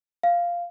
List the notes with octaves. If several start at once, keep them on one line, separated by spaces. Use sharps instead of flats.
F5